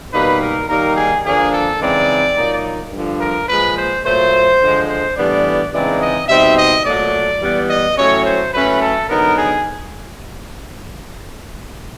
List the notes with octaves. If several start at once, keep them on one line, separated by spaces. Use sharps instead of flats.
B2 G3 A#3 D#4 B4
A#4
D#3 G3 A#3 D#4 A#4
G#4
D3 F3 A#3 D4 G#4
A4
C#3 E3 G#3 C4 D#4 D5
A#2 F#3 A#3 D#4
G2 D3 F3
A#4
A#2 F3 G#3 B4
C5
A#2 F#3 A3 C5
D3 F3 G#3
C5
A2 E3 G3 B3 D4 D5
C#3 E3 G#3 C4 D#4 D5
D#5
B2 G3 C4 D#4 E5
D#5
A#2 F#3 A3 D5
E3 G3 B3
D#5
A2 F#3 A3 C#4 C#5
C5
A2 F#3 A3 C#4 B4
A4
D3 F#3 B3 D#4 A#4
G#4